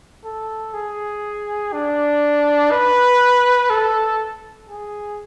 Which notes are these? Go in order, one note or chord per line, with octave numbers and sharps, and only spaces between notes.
A4
G#4
D4
B4
A4
G#4